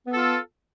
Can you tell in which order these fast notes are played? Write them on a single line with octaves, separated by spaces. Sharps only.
B3 A4 F4